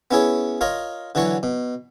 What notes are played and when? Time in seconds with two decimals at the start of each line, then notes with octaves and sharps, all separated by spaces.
0.11 B3 C#4 E4 G#4 C#5
0.61 F4 A#4 C#5 D#5
1.15 D3 E3 F#3 C#5 C#6
1.43 B2